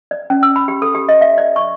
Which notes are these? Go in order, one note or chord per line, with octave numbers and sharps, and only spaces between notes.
D5
C#4
E6
B5
G4
A4
G4
D#5
E5
D5
C#6